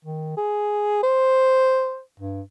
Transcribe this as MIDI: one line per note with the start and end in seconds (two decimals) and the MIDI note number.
0.05 0.34 51
0.37 0.99 68
1.03 2.00 72
2.20 2.41 43